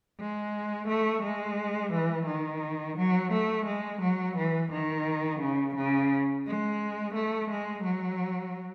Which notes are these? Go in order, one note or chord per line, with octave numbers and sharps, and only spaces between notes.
G#3
A3
G#3
E3
D#3
F#3
A3
G#3
F#3
E3
D#3
C#3
C#3
G#3
A3
G#3
F#3